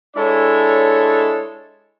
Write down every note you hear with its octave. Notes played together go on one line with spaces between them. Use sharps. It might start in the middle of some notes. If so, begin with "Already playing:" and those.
G#3 D4 E4 A4 C#5